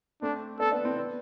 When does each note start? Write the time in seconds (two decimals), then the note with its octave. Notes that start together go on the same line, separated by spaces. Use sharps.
0.22 A3 C4 D4
0.59 B3 D4 A4
0.72 B3 D4
0.84 C4 E4
0.97 B3 D4